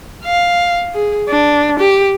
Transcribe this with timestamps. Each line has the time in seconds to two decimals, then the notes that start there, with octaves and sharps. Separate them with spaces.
0.25 F5
0.94 G#4
1.29 D4
1.79 G4